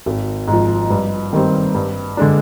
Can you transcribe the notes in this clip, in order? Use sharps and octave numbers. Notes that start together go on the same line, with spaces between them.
G#1
G#2 F3
G2
D#3 G3 C4
G2
D3 G#3 D4